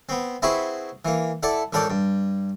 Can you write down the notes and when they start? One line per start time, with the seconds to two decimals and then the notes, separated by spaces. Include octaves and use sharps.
0.09 B3 C4
0.42 C4 E4 F#4 G#4 B4
1.05 E3 A#3
1.43 E4 A4 D5 F#5
1.73 A1 G#2 A4 A#4 D5 G5
1.90 G2